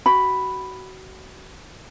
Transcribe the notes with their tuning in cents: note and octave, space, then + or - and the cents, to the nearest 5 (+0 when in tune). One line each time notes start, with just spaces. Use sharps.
F#4 +25 B5 +0